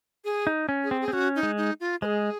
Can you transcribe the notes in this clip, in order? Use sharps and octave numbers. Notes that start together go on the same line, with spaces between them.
G#4
D#4
C#4
G#4
C4
G#4
C4
C#4 F#4
D#4
G#3
D#4
F4
G#3 G#4 C5